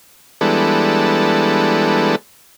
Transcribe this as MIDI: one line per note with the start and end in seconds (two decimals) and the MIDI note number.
0.41 2.16 52
0.41 2.16 55
0.41 2.16 56
0.41 2.16 59
0.41 2.16 62
0.41 2.16 69